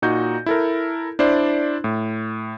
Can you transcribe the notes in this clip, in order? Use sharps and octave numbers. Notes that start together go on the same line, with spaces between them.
A#2 D#4 F#4 G6
E4 A4 A#4
D4 E4 C5 D5
A2